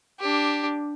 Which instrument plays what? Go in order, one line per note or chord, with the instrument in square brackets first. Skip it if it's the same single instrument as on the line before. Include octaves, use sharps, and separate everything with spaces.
[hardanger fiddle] D4 G4